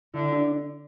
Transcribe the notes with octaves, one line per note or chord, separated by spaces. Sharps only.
D3 E4
D4